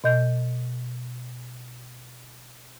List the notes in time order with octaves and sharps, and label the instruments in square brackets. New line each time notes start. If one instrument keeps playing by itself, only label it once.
[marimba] B2 D#5 G6